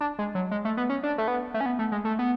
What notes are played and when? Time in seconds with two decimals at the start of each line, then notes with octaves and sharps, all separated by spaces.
0.01 D4
0.19 G#3
0.35 F#3
0.51 G#3
0.65 A3
0.77 B3
0.90 C#4
1.03 D4
1.18 A3
1.28 B3
1.54 A3
1.61 C#4
1.66 B3
1.79 A3
1.92 G#3
2.05 A3
2.19 B3